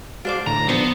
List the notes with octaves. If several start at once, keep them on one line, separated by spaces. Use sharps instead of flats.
G#3 D4 F#4 C5 F5 D6
A2 D3 E3 A#5
F3 B3 D4 A4 C5